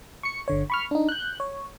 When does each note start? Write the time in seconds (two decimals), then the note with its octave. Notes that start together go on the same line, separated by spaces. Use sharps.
0.23 C#6 C#7
0.48 G1 D3 C#5
0.70 B5 C#6 F6
0.91 D4 D#4
1.09 F#6 G6
1.40 C#5